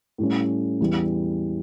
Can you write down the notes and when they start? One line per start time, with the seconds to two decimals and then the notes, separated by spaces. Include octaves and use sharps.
0.18 A2 G3 C#4
0.81 E2 E3 G3